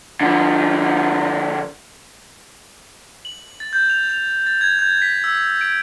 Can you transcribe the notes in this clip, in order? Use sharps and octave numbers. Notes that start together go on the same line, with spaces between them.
D3 F3
F#7
A6
G6
F7
F7
A6
G#6
G6
B6
E6
D7